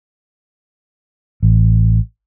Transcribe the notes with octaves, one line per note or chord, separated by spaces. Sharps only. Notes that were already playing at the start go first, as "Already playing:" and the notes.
A1